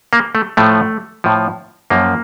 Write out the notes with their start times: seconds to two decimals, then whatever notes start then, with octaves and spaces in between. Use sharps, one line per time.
0.13 A#3
0.35 A3
0.57 A2 F3 A3
1.24 A2 F3
1.90 F#2 F3 A#3